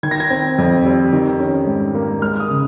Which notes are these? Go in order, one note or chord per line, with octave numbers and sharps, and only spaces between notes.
D#3 G#6
A#6
G#6
C4
F2
G3
D#3
C#4
G#2
A#3
G#3 F6
D#6
C#3